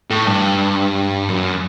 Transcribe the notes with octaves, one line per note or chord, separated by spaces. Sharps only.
A2
G2
F#2